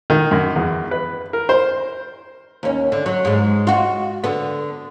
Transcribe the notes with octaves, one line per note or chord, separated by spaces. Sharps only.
D#3
F#2
E2
B4
A#4
C5
D#2 C#4
D3
F#3
G#2 G#3
F4 F#4
D3 B3